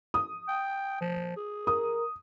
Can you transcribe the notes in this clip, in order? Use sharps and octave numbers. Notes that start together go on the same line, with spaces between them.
D#6
G5
F3
G#4
A#4 D#6